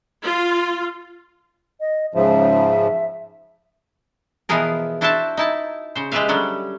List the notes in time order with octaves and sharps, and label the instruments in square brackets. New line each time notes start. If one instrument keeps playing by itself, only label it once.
[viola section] F4
[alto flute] D#5
[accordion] G#2 C#3 F3 [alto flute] E5
[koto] B2 E3 F3 B3 G#4 A#4
D4 E4 F#4 C5 E5 A5
D#4 E4 A5
C#3 C5
G#3 F4 G4 B4 E5 F5
D3 F#3 G3 C#4